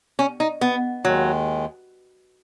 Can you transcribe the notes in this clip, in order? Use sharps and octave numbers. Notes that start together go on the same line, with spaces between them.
C#4
D#4
B3
D#2 D#3 F#3 G#3